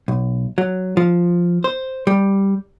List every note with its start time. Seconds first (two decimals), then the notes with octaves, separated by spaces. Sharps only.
0.08 B1
0.58 F#3
0.97 F3
1.64 C5
2.07 G3